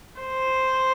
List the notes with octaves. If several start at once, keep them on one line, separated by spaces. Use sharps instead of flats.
C5